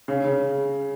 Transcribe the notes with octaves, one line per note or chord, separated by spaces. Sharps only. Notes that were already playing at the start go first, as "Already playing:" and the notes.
C#3
C#3